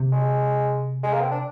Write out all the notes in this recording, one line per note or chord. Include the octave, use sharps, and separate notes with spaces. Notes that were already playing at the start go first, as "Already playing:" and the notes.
Already playing: C3
G#3
G#3
A#3
C4
D4